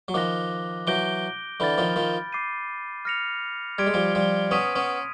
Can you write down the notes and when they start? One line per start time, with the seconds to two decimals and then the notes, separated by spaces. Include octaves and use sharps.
0.08 F#3
0.14 D#3 F3 D6 F#6 A#6
0.87 E3 F#3 G6 A#6 D7 G7
1.60 D3 E3 B5 D6 F6 A6
1.78 D#3 F3
1.96 D#3 F3
2.33 D6 G6 C7 D#7
3.05 F6 A#6 C#7 F7
3.78 G3 C6 F6 G#6 B6 D7
3.87 G#3
3.94 F3 G3
4.15 F3 G3
4.51 B3 C#4 D#6 G#6 B6 D#7
4.75 B3 C#4